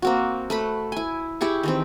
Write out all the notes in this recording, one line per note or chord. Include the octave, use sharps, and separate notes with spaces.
A#3 C4 F#4
A3 B4 B5
E4 G#5
E4 G4 G#4 C#6
D#3 E3 C4